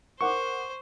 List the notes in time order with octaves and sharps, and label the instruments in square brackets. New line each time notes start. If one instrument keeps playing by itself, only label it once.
[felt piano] A#4 F#5 D6 [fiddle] C5 [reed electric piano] C#6